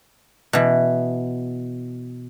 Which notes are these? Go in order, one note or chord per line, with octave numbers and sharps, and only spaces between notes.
B2 E3